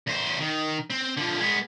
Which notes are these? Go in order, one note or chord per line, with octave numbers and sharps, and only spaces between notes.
E2 C5
D#3
C4
D3 F3
G#3 B3